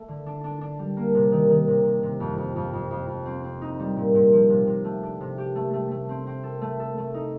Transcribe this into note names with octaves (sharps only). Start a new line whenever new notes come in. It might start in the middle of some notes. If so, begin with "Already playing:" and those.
Already playing: A3
D3
D4
D4
D4
G3
A#3
C3
D#3
D#3
C3
C3
C3
F2
F2
F2
F2
F2
F2
C4
C4
D#4
G3
A#2
A#2
F3
C3
C3
A3
D4
C3
G4
A3
A3
A3
C4
C4
A4
A3
A4
A3
D#4